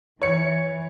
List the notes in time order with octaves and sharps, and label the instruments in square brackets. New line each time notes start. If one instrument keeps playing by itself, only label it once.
[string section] E3 [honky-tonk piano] C#5 C#7